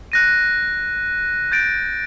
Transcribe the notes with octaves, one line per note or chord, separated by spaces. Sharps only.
F#6 A#6 D#7
G6 A6 D7